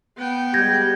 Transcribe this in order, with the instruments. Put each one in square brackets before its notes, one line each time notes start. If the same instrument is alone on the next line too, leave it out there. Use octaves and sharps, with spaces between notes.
[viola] B3 G5
[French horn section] G3 G#3 G4 [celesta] G6 G#6 A#6